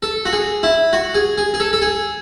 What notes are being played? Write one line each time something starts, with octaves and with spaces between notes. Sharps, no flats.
A4
F#4
G#4
E4
F#4
G#4
G#4
G#4
A4
A4
G#4